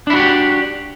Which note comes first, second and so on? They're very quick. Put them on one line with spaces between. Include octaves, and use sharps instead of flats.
D4 E4 F#4 D5 G4